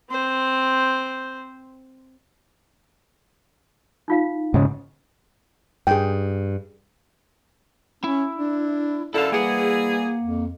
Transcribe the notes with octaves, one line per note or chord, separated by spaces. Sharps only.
C4 C5
D#4 F4 F5
G#2 C#3
G2 G#4 G5
C#4 E4
D4
F#2 D3 E4 A4 F5
E3 G3 A#3 G#4 F#5
F2